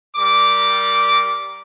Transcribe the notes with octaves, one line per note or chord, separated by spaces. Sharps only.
G3 A#4 D6